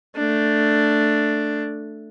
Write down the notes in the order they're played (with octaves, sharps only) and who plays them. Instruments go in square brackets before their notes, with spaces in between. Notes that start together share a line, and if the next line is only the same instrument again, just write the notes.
[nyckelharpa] A3 D4